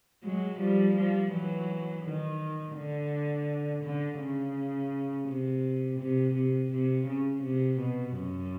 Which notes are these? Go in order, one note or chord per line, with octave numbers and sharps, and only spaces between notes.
F#3 G#3
F3 G3
F3 G3
E3 F#3
D#3
D3
D3
C#3
C3
C3
C3
C3
C#3
C3
B2
F#2